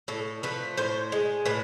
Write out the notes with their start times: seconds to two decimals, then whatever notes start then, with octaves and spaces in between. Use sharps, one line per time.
0.08 A2 A4
0.43 F3 A3 B4
0.77 A2 C5
1.12 G#3
1.46 A2 B4